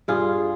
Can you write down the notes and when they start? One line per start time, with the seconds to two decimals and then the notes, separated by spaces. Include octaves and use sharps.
0.08 G2 F4 G#4